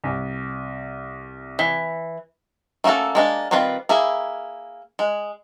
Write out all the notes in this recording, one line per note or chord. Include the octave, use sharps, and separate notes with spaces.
C2
E3
A3 A#3 C#4 F#4 A4
G#3 A#3 D4
D#3 G3 C4 F4 B4
A#3 E4 G#4
G#3